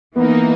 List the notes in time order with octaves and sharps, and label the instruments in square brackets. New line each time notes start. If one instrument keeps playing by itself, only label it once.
[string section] E3 A#3 D#4 [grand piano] B3